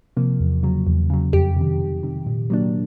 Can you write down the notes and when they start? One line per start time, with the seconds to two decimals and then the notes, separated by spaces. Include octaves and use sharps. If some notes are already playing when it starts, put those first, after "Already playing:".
0.17 C3 F3 A#3
0.40 E2
0.63 C#3 F#3
0.87 E2
1.10 C#3 F#3
1.33 F2 G4
1.57 C3 D#3
1.80 F2
2.03 C3 D#3
2.27 A#2
2.50 F#3 A#3 D4